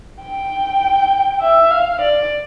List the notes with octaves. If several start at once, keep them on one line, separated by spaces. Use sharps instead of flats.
G5
E5
F5
D5